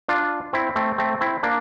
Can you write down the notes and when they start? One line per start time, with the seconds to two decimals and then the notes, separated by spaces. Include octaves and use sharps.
0.09 D4 F4
0.53 C4 E4
0.76 A3 C4
0.98 A3 C4
1.21 C4 E4
1.43 A#3 D4